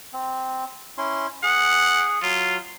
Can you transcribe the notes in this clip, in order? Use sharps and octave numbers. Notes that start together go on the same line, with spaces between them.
C4
C#4 E4 C6
G#4 F#5
F#3 F4